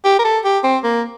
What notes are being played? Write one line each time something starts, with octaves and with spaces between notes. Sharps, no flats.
G4
A#4
A4
G4
C4
A#3